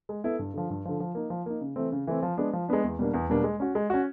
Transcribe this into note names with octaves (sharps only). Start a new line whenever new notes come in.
G#3
B3 E4 A4
G2
D3 F3
G2
D3 F3
F3
A#3 D#4
F3
A#3 D#4
C#3
E3 A3 C4
C#3
E3 A3 C4
F3
G#3 B3 D4
F3
G#3 B3 D4
E2
B2 G3 A#3 D4
E2
B2 G3 A#3 D4
G#3
C#4 F#4
G#3
C#4 F#4